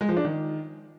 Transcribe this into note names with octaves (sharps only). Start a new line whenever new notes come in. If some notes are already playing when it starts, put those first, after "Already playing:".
G#3
F3
D4
D#3